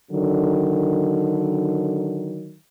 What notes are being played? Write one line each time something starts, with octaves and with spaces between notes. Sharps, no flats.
D3 D#3 F#3